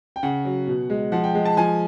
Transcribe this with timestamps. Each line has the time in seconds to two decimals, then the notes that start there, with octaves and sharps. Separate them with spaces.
0.16 G5
0.23 C#3 F#5
0.45 F#3
0.67 B2
0.90 G#3
1.12 F3 F#5
1.24 G5
1.35 G#3
1.45 A5
1.57 F3 G#5